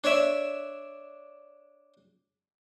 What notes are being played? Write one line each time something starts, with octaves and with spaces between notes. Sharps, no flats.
D4 C#5 D5 E5